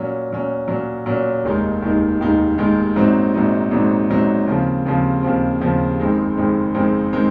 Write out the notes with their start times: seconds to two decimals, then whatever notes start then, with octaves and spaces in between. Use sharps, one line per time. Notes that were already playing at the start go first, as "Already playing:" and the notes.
Already playing: A#2 F#3 C#4
0.30 A#2 F#3 C#4
0.68 A#2 F#3 C#4
1.06 A#2 F#3 C#4
1.43 F1 D#2 D#3 G#3 D#4
1.82 F1 D#2 D#3 G#3 D#4
2.20 F1 D#2 D#3 G#3 D#4
2.58 F1 D#2 D#3 G#3 D#4
2.96 A#1 G#2 F#3 C4 D#4
3.34 A#1 G#2 F#3 C4 D#4
3.71 A#1 G#2 F#3 C4 D#4
4.10 A#1 G#2 F#3 C4 D#4
4.47 D#2 C#3 F3 C4
4.85 D#2 C#3 F3 C4
5.23 D#2 C#3 F3 C4
5.60 D#2 C#3 F3 C4
5.99 F#1 F2 D#3 G#3 C4
6.36 F#1 F2 D#3 G#3 C4
6.74 F#1 F2 D#3 G#3 C4
7.13 D#3 G#3 C4